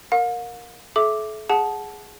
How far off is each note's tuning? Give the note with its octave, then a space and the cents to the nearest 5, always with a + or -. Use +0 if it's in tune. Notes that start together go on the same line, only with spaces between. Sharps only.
A#4 +0 F5 +45
A4 -40 E5 +0 D6 +0
G#4 +0 F#5 -5 A5 -20